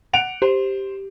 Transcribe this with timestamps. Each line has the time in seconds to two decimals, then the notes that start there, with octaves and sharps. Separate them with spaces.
0.13 F#5 D7 F7
0.42 G4 C5